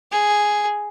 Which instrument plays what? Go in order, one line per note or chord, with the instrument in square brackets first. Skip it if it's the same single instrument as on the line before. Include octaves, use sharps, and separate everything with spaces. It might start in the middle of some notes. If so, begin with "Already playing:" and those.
[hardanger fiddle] G#4